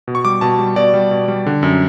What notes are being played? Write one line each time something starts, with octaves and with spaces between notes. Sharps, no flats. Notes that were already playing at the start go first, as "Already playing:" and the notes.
B2
C#6
G3 D6
B2 A5
G3
B2 D5
G3
B2
G3
D3
F#2